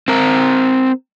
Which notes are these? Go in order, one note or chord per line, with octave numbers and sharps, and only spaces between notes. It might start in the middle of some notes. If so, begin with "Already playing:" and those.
C4 A#4